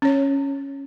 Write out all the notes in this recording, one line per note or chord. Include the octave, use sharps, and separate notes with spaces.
C#4 C#5